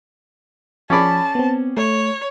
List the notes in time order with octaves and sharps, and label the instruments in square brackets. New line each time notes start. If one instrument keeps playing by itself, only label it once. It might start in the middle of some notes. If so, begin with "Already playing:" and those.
[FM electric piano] F3 B5 [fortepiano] C#4 G#4 D5 [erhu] A5
[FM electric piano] B3 C4
[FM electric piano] A3 [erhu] C#5